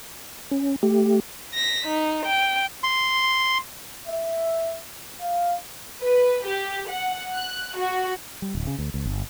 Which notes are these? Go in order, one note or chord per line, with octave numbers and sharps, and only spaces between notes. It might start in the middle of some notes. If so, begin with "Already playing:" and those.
C#4
A3 G4
A#6 B6
D#4
G5
C6
E5
F5
B4
G4
F#5
F#6
F#4
G3
D1
C#3
D2
C#2
G1